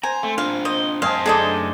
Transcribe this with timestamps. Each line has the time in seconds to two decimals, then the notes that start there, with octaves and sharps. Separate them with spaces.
0.03 C5 G#5 A#5
0.23 A3 C4
0.38 D4 F4 F5
0.65 C5 D#5
1.02 F#2 G#3 C4 G#4 F5 A5
1.26 A3 D4 D#4 G#4 A4 D#5